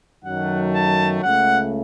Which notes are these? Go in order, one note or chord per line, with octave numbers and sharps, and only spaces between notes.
F#2 D#3 F#3 A3 F#5
A5
C#2 C#3 A3 F#5